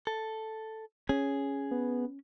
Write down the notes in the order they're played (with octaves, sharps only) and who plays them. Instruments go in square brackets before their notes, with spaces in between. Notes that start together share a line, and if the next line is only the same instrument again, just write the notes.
[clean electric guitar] A4
[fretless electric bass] C#4 [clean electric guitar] G#4
[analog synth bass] B3